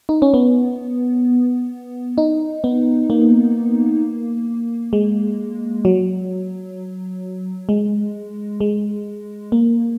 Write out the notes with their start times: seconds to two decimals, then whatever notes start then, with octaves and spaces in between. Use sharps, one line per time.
0.09 D#4
0.22 C#4
0.34 B3
2.18 D#4
2.64 B3
3.10 A#3
4.93 G#3
5.85 F#3
7.69 G#3
8.61 G#3
9.52 A#3